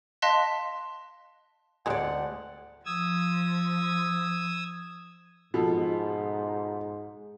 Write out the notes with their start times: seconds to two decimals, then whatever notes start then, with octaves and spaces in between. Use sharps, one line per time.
0.22 D#5 F5 A5 C6 F#6 B6
1.86 D2 G3 G#3 G#4 D5 F#5
2.86 F3 D#6 E6 G#6
5.54 G#2 B2 F3 A4